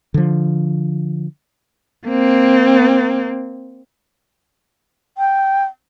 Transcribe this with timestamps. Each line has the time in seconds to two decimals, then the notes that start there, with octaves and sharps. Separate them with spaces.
0.14 D3 F3
2.07 A#3 C4
5.18 G5